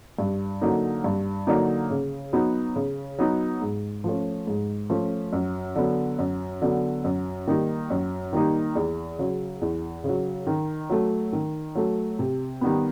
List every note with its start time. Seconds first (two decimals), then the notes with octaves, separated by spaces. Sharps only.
0.19 G2
0.61 D3 F#3 A#3 D#4
1.04 G2
1.47 D3 F#3 A#3 D#4
1.90 C#3
2.33 F#3 B3 D#4 F#4
2.76 C#3
3.18 F#3 B3 D#4 F#4
3.61 G#2
4.04 F3 A3 C#4
4.47 G#2
4.90 F3 A3 C#4
5.33 F#2
5.76 D3 F#3 B3
6.19 F#2
6.62 D3 F#3 B3
7.04 F#2
7.48 D#3 G3 A#3 D#4
7.90 F#2
8.33 D#3 G3 A#3 D#4
8.75 E2
9.19 C#3 F#3
9.61 E2
10.04 C#3
10.09 F#3
10.47 D#3
10.90 F#3 A3
11.33 D#3
11.75 F#3 A3
12.19 C3
12.61 D#3 G3 B3